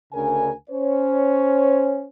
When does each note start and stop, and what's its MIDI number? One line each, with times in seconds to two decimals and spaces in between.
0.14 0.51 38
0.14 0.51 49
0.14 0.51 62
0.14 0.51 70
0.14 0.51 80
0.70 2.06 61
0.70 2.06 72
0.70 2.06 73